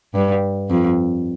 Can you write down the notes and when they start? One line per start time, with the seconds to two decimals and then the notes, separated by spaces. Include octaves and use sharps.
0.14 G2
0.70 F2